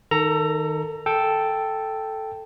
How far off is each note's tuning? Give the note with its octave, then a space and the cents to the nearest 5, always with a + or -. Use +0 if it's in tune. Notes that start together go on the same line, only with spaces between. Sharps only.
D#3 +0 A4 +25 A#5 +0
A4 +0 G5 +0